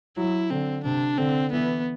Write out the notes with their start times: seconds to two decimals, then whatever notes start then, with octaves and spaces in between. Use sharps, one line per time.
0.17 F#3 E4
0.50 D3 C4
0.84 C3 D4
1.18 D3 C4
1.52 E3 B3